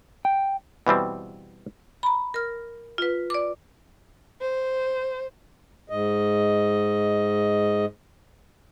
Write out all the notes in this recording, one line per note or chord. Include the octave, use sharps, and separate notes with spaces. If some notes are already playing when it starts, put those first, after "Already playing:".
G5
B2 E3 G3 C4
A#5 B5
A#4 F6
F4 B4
D5 D6
C5
G#2 D#5